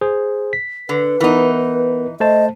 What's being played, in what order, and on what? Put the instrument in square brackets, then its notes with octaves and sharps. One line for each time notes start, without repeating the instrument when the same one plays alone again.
[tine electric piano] G#4 C5
B6
[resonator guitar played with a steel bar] D3 [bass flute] B4
[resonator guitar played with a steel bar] E3 D#4 [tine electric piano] B3 A#4
[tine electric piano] A3 C5 A5 [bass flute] D#5